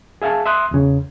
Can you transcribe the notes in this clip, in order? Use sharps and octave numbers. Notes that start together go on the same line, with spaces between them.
G#4 E5 F5 G#5 A5
E5 C6 D#6 F#6
E2 C#3